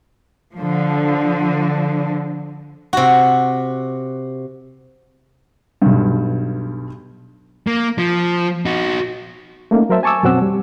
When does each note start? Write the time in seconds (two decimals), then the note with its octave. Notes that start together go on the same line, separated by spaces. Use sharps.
0.55 D3 F3
2.93 C3 F#4
5.82 B1 G2
7.67 A#3
7.98 F3
8.65 D#4 F#4
9.71 A3 A#3 C#4 D#4
9.89 F#3 A#4 C5 E5 A5
10.03 G#5 A5 C#6 D6 E6
10.23 F#2 B2 F#3 C4 F#5 E6
10.42 G3